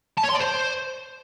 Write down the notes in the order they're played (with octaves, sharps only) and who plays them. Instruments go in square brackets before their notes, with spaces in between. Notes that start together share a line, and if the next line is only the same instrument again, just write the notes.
[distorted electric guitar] A5
C#5
C6
D5
C5